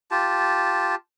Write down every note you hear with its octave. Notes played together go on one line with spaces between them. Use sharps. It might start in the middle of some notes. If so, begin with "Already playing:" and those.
F4 G4 A5